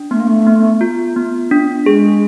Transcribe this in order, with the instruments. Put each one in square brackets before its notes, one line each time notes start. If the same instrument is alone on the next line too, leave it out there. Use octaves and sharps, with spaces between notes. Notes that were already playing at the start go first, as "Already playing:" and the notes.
Already playing: [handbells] D4
[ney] A3 [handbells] B3
[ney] A#3
A3
[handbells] B3
F4
B3
D4
[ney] G#3 [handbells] G#4